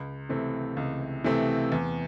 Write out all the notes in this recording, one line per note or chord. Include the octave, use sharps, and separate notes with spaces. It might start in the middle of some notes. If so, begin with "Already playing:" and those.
Already playing: C#2
C3 E3 A3 C4
C#2
C3 E3 A3 C4
E2